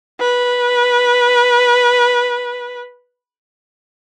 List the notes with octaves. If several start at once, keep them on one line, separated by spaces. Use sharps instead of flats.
B4